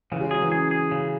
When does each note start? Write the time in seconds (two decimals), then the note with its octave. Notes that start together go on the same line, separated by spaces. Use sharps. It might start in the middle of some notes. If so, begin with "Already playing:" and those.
0.12 C#3 E3
0.21 G#3
0.31 F#3 G#4
0.42 E3
0.52 C#3 G#4
0.71 G#4
0.91 C#3